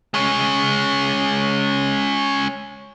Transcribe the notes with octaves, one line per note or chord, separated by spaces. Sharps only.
G#3 C#4